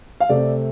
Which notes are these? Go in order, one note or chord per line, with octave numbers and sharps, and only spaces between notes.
F5
C3 A3 C4 D5